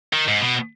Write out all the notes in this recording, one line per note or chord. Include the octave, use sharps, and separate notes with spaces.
D#3
G#2
B2